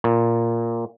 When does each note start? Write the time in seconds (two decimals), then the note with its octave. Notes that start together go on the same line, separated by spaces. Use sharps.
0.04 A#2